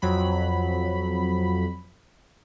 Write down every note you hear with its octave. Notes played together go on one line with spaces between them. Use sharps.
F2 F#3 B5